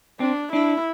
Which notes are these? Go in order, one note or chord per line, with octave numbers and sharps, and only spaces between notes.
C4 D4
D4 E4